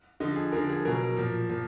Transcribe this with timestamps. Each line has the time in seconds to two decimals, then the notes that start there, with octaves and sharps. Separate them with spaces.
0.20 D3 F3 D#5
0.36 G#4
0.52 D3 F3 A#4
0.69 G#4
0.85 B2 F#3 A#4
1.17 A#2 F3
1.49 A#2 F3